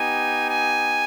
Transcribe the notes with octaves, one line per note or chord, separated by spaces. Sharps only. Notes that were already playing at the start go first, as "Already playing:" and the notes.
Already playing: B3 D#4 G4 G#5
G#5